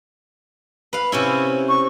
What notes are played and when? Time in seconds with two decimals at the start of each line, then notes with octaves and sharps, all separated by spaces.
0.93 B4 F5
1.12 C3 C#4 E4
1.68 C#6